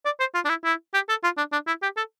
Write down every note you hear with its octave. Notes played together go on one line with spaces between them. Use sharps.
D5
C5
F4
D4
E4
E4
G4
A4
F4
D4
D4
E4
G4
A4